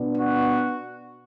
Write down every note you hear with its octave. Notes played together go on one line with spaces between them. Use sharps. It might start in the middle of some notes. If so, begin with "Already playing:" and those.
Already playing: B2 B3 D4
F#4